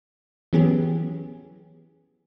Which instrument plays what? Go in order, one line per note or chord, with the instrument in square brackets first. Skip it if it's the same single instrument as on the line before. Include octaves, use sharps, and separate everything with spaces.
[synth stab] E3 F#3 B3 C#4 G4 G#4